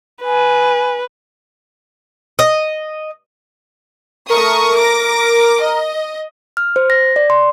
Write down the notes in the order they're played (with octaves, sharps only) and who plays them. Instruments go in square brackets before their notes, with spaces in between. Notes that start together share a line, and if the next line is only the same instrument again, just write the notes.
[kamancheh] B4 [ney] G#5
[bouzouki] D#5
[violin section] A3 C#6 D#6 [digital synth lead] A#4
[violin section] D6 A#6
D#5
[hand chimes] F6
C5
A#6
D5
C6